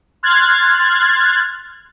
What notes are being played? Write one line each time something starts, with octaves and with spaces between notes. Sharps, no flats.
C6 F6 F#6 G#6 A6